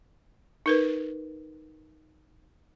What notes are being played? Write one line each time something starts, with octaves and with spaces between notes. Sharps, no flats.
D#4 A#4 B4